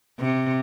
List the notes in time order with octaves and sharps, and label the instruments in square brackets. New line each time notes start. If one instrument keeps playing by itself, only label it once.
[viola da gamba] C3